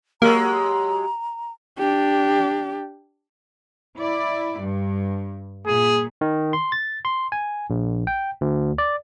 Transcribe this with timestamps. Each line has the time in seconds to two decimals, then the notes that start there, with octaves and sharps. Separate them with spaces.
0.22 F#3 G#3 A#3 G4 A#5
1.78 D4 G4
3.98 E4 D5
4.59 G2
5.67 A#2 G#4
6.21 D#3
6.53 C6
6.72 A6
7.05 C6
7.32 G#5
7.70 A#1
8.07 G5
8.41 D2
8.78 D5